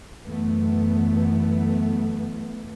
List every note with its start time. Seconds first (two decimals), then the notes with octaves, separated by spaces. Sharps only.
0.22 F#2 E3 A3 B3